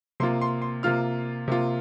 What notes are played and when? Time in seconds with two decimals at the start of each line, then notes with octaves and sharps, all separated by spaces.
0.20 C3 A#3 F4 C6
0.41 C6
0.62 C6
0.83 C3 A#3 F4 F6
1.48 C3 A#3 F4